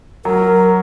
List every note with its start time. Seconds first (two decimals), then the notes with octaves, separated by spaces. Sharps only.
0.25 F#3 A#4